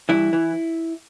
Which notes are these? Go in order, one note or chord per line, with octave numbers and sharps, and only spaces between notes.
G2 E3 E4
E3